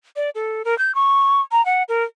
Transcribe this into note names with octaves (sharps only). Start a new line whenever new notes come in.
D5
A4
A#4
G6
C#6
A#5
F#5
A#4